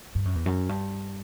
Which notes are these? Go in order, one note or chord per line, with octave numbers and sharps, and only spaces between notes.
G2
F#2
E2
F#2
G2